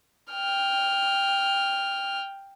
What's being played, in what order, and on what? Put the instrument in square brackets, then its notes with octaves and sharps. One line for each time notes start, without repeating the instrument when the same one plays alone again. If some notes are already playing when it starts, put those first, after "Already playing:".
[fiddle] G5 F6